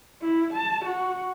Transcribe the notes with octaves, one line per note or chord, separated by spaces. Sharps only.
E4
A5
F#4